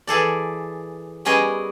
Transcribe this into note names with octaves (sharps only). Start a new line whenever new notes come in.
E3 G#4 A4 D5
G3 B3 C#4 G#4 A#4 D#5